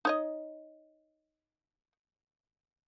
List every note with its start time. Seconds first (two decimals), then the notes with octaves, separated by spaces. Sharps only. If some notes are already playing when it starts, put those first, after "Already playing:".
0.05 D#4 C#5 D#5